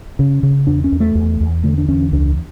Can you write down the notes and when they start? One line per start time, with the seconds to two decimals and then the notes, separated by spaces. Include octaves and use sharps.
0.19 C#3 C#4
0.43 C#3
0.67 E2 D4
0.84 C#4
0.92 E2
1.00 A3
1.15 E2
1.41 E2
1.64 D3 A3
1.78 D4
1.88 E2 C#4
2.12 C#2 D4